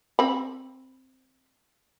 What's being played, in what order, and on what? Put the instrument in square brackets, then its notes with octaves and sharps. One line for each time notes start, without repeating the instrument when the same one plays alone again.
[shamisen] C4 B5